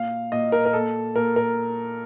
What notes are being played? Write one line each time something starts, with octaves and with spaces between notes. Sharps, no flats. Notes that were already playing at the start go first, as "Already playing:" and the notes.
Already playing: A#2 F5
A#2 D#5
A#4
A#4
A#2 A4
A#2 A#4
A#4